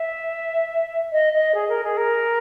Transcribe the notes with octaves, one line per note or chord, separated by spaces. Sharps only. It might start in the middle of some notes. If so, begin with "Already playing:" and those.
Already playing: E5
D#5
D#5
G#4
A#4
G#4
A#4